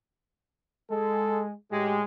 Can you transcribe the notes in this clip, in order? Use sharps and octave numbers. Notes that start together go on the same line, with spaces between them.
G#3 A4
A2 G#3 G4